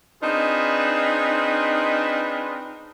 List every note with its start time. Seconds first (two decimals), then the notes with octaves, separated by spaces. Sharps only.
0.22 C4 D4 D#4 F4 G#4 B4